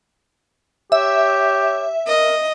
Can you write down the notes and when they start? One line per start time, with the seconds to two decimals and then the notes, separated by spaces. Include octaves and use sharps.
0.92 G4 C#5 E5
2.07 A#4 D#5